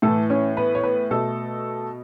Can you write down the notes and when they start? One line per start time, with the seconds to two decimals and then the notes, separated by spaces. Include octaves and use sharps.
0.02 A2 E3 A3 A4
0.30 C#4 C#5
0.57 B3 B4
0.75 C#5
0.83 B3 B4
1.11 B2 A3 A4